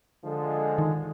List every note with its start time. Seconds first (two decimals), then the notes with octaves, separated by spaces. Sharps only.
0.23 D3 F3 G#3
0.78 D#3